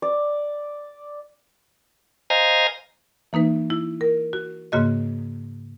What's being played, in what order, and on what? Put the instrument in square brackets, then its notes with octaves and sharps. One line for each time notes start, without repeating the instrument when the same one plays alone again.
[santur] D5
[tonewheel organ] C5 D#5 F5 G#5 A#5
[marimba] E3 A#3 D#4 B4
E4
A#4
F#4
G#2 C#3 A#3 F#4 D#5